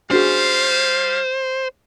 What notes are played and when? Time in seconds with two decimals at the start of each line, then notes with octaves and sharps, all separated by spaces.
0.11 G3 D4 F#4 G#4 C5 F5